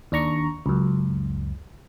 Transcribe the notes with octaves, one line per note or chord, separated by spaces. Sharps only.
D#2 D4 A#5 C#6
C#2 F#2